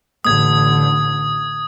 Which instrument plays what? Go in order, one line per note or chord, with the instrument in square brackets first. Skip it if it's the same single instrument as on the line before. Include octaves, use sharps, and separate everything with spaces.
[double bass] A1 D3 [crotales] D#6 G#6